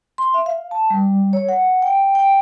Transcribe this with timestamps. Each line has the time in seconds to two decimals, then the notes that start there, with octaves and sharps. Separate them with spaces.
0.18 C6
0.34 E5
0.46 F5
0.71 A5
0.90 G3
1.33 C#5
1.49 F#5
1.82 G5
2.15 G5